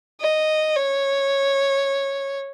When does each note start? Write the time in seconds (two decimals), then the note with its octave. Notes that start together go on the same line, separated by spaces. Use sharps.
0.21 D#5
0.76 C#5